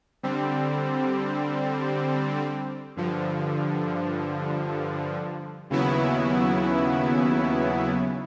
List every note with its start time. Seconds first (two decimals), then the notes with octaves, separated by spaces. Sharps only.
0.23 D3 G3 C4
2.96 G2 D3 F3
5.70 D#2 C#3 F#3 B3 E4